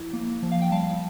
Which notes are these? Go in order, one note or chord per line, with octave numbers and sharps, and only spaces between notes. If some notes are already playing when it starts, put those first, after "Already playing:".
Already playing: F3 E4
A#3
F3
F5
G5
G3 F5 A5